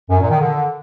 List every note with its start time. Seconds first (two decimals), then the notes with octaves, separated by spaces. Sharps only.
0.10 F#2
0.20 A#2
0.30 D#3
0.40 D3